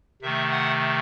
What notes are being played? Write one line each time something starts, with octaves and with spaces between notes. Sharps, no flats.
C3 D#3 A3 E5
F#5